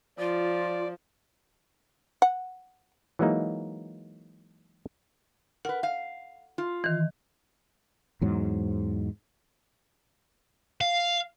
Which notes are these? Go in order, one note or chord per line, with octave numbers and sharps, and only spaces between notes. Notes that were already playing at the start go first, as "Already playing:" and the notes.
F3 F4 D5
F#5
E3 F#3 G#3 A#3 D#4
A#4 B4 F#5
F5
F4
D#3 E3
E2 G#2 F#3
F5